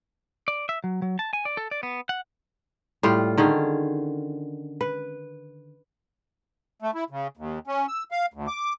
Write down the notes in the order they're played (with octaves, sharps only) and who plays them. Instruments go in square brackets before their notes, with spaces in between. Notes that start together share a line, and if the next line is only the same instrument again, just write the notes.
[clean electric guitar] D5
E5
F#3
F#3
A5
G#5
D5
A4
D5
B3
F#5
[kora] A2 G3 F4
D3 D#3 C#4 G#4
B4
[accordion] A3
E4
C#3
D#2
C#4
E6
F5
D2
D6